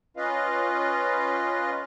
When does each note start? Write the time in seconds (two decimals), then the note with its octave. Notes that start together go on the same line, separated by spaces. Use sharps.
0.17 C#4 F4 B4 D#5 F5